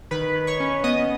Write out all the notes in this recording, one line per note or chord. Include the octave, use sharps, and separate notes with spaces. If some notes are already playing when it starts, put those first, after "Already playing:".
D#3 B4 B5
D#3
C#5 C#6
C#4
B3 D#5 D#6